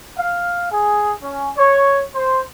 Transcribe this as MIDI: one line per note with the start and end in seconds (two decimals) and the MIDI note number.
0.17 0.69 77
0.70 1.11 68
1.22 1.49 61
1.56 2.03 73
2.14 2.43 72